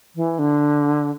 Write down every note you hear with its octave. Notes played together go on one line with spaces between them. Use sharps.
E3
D3